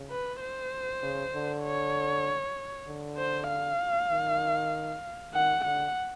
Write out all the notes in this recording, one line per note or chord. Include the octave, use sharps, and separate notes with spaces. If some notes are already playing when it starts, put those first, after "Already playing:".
Already playing: C#3
B4
C5
C#3
D3
C#5
D3
C5
F5
D#3
D#3 F#5
D3 F#5